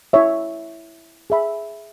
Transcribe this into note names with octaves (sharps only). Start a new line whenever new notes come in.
E4 C#5 E5
G#4 E5 B5